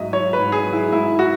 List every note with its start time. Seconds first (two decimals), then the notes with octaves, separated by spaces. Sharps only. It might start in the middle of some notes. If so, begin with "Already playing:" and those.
Already playing: G#2 F#3 D#5 E5
0.13 F#3 C#5
0.33 B4
0.39 G#2
0.52 G#4
0.66 F#3
0.73 E4
0.92 G#2 E4
1.19 F#4